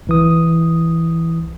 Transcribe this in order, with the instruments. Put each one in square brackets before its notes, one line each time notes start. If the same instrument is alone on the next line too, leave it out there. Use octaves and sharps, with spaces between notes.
[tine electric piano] C2 E3 D#6